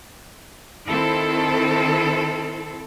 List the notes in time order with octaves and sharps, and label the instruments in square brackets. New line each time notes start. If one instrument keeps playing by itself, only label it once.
[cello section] D#3 C4 E4 A4